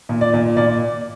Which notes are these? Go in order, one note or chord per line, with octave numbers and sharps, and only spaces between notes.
A#2
D5
A#2
A#2 D5